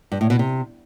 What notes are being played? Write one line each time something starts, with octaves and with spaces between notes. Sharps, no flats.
G2
A2
B2
C3